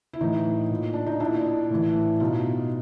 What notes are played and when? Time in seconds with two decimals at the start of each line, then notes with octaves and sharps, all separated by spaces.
0.13 E4
0.21 A2 E3 D#4
0.71 A#2
0.93 D4
1.07 D#4
1.20 A#2 D4 E4
1.70 A2 E3
2.20 B2 D#4 F4